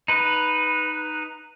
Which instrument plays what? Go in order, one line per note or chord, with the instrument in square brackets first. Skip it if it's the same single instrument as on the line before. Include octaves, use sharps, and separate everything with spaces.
[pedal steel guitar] D#4 B4